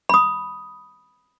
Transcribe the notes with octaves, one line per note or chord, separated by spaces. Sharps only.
B5 D#6